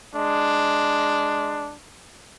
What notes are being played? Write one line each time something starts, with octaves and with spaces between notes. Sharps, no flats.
G#3 D4